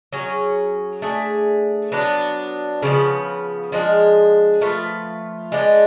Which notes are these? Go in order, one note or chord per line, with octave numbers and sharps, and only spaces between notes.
F#3 C#4 G#4
A3 D4 G#4
F#3 B3 D4
C#3 F3 B3
F3 G#3 D4 G#4
F3 A3 F4 B4
G#3 B3 D4